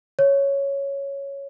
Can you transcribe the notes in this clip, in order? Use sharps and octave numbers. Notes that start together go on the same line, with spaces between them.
C#5